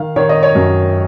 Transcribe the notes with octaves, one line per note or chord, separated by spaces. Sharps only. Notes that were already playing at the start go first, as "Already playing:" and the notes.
Already playing: D#3 F5
D#3 C#5
D#5
C#5
F#2